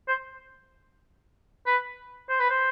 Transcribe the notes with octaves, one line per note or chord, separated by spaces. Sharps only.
C5
B4
C5
B4
C5